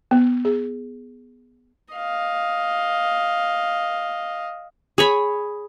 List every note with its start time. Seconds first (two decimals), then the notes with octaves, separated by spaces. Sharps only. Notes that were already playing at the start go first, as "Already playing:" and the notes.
0.11 B3
0.45 G#4
1.94 D#5 F5
4.98 G#4 C#5 B5